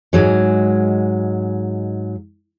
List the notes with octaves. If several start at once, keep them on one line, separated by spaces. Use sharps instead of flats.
G#2 F#3 G#3